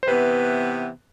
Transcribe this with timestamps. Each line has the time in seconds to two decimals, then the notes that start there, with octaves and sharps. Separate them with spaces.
0.03 C5
0.07 C3 E3 B3 B4